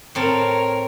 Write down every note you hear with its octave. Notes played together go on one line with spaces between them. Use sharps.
A2 C4 A#4 C#5 A5